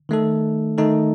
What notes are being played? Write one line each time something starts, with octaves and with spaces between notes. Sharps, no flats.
D#3 A3 D#4 A4
D#3 A3 D#4 A4